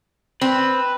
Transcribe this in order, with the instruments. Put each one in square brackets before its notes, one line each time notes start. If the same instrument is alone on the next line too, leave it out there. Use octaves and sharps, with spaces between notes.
[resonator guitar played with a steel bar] C4 [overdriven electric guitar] B4